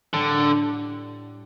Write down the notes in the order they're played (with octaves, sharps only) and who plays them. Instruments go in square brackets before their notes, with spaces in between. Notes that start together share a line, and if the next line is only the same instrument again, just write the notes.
[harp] A2 G3 D4 G4 [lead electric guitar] D3